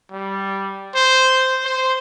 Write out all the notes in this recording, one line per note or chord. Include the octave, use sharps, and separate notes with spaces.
G3
C5
C5